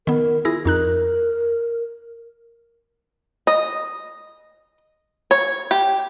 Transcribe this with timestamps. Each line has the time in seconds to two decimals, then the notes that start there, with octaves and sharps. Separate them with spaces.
0.07 D#3 B3 A#4
0.45 E4 F4 G#4 A#6
0.65 F2 D#4 A#4 F#6
3.47 D#5
5.31 C#5
5.71 G4